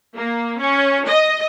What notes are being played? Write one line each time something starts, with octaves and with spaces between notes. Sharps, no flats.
A#3
C#4
D#5